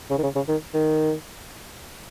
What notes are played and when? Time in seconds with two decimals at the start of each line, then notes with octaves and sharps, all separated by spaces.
0.10 C#3
0.18 D#3
0.23 C#3
0.36 C#3
0.48 D#3
0.74 D#3